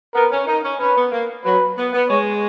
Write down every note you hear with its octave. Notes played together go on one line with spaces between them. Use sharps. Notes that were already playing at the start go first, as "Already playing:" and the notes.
B3 A#4
C#4
D#4 A#4
C#4
C#4 B4
B3
A#3
F#3 B4
B3
B3
G#3 C#5